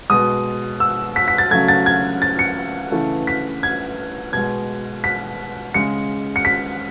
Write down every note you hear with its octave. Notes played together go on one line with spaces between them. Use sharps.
B2 G#3 D#6
E6
B6
B6
A6
C#3 F#3 A3 G#6
A6
G#6
A6
C#7
C#3 E3 A3
B6
G#6
B2 G#3 G#6
B6
C#3 G#3 C#7
C#7
B6